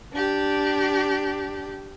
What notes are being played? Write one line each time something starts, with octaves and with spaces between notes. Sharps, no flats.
D4 G4